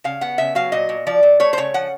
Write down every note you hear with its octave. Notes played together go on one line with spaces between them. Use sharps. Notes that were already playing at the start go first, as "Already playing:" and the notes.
C#3 F5
B3 F#5
C#3 E5
F#3 F5
A#2 D#5
A#2
F3 D5
A#2
A3 C#5
C5
C#3 C#5
F3 F#5